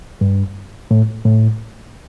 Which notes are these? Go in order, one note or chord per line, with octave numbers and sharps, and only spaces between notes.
G2
A2
A2